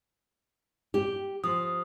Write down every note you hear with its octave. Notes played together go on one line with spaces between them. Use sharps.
G4
F3 D#6